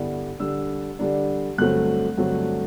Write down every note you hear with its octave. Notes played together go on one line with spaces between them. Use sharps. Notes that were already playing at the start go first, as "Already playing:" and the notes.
Already playing: G2 D3 G3 B3 E4
D3 G3 D4 E6
D3 G3 D4
G2 D3 F#3 A3 C4 F#6
G2 D3 F#3 A3 C4